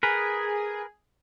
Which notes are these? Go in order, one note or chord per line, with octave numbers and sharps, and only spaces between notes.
G#4 A#4 B4